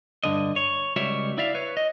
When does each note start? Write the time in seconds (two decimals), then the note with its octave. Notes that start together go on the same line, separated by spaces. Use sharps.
0.24 G2 D3 D#5
0.56 C#5
0.96 C#2 G3 F#4 C#5 E5
1.38 E4 D5 E5 F5
1.55 B4 C#5
1.77 D#5